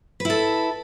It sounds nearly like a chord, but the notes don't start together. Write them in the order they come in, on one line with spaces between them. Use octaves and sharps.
B4 E4 A4